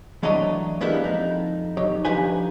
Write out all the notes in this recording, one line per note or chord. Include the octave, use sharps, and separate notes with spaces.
E3 F#3 A3 D4 C#5 D#5
G#3 A#3 B3 D4 E4 G4
F2 D#4
F#3 D#4 G4 C#5
D3 F3 D#4 G4 B4 G#5